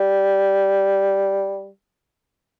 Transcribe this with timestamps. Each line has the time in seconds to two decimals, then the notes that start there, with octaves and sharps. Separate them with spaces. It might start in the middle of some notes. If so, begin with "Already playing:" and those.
Already playing: G3